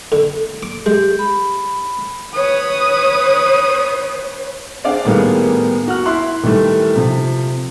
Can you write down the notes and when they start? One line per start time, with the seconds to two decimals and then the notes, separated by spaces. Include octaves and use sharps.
0.12 D3
0.63 D6
0.86 G#3 G4
1.19 B5
2.34 B4 C#5 D#6
4.84 C4 D4 G#4 D5 F5 F#5
5.05 A2 D#3 G3 A#3 B3 G#4
5.88 F#4 F#5 F6
6.06 E4 C6 F#6
6.43 D#3 E3 G3 A3
6.96 C3 F3